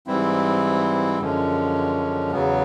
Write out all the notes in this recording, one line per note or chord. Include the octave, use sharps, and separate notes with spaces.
G#2 E3 G3 C4 E4
F#2 D3 F3 G#3 C#4
E2 C#3 F#3 B3